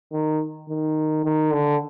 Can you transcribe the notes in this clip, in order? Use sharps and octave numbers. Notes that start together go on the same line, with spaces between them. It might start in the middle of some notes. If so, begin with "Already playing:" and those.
D#3
D#3
D#3
D3